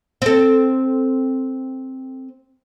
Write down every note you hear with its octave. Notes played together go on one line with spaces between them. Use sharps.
C4 A4